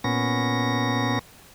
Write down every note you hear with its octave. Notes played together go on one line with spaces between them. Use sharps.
A#2 B3 C#4 A#6